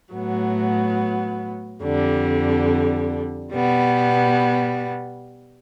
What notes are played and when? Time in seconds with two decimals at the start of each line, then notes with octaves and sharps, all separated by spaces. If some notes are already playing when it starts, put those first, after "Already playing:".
0.13 A2 F#3 B3
1.83 F2 D3 G3
3.53 B2 G3 B3